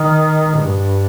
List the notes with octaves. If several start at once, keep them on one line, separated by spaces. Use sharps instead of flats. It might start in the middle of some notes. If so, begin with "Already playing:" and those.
Already playing: D#3
G2